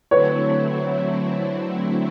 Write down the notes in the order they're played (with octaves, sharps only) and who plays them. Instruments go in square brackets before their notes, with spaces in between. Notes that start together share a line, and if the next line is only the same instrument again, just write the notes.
[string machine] D3 F#3 A3 C4 E4 [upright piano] B4 C#5